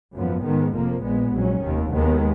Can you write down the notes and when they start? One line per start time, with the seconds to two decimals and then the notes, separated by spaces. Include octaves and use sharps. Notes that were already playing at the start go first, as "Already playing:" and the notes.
0.14 G#1 F#2 F3 B3
0.44 G#2 D#3 G#3 B3
0.74 F1 F2 F3 A#3
1.04 A#1 A#2 G#3 B3
1.33 A#1 G#2 F#3 C#4
1.64 F1 D#2 D#3
1.93 D#2 D#3 G#3 B3